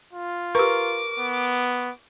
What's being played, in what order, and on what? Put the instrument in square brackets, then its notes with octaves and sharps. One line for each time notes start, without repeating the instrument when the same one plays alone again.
[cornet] F4
[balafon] G4 B4 [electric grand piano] A#4 C#6 [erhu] D6
[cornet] B3